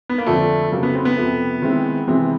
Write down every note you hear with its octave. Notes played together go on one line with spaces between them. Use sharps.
B3
A#3
F2 D3 F3 A3
F2 C#3 F#3 A3 A#3
B3
C4
B3
F2 C3 F3 A3
D#3 G#3 C4 E4
C3 E3 G#3 B3 C4